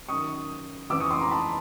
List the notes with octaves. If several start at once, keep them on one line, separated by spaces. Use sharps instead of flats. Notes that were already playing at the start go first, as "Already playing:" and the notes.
F#2 D#3 C#6 D#6
F2 C#3 E3 D6 E6
C#6 D#6
C6 D6
A#5 C6
A5 B5